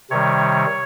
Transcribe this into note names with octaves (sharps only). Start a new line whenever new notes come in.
C3 D#3 G3 C#5